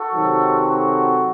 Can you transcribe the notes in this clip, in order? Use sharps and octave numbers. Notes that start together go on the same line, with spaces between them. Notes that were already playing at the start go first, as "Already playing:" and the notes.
Already playing: F#4 A4
C3 D#3 F#3 C4
F#4 A4